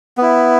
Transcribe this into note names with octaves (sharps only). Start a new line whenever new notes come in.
B3 E4